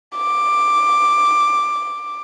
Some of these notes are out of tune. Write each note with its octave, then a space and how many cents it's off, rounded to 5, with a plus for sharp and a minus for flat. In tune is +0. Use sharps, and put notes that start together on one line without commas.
D6 +10